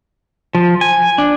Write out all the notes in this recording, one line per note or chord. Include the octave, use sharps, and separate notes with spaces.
F3
G#5
D4